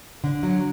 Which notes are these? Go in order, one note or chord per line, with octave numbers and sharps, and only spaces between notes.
D3
F#3